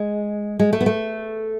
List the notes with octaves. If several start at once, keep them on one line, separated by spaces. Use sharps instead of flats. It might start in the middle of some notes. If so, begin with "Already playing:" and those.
Already playing: G#3
G#3
A3
B3
A3